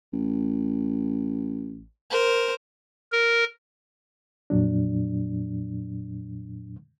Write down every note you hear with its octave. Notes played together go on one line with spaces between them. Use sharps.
A1
A#4 C5
A#4
F2 A#2 F#3 D4